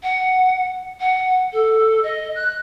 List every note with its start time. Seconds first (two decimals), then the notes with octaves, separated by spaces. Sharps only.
0.03 F#5
1.00 F#5
1.53 A4
2.03 D#5
2.35 F#6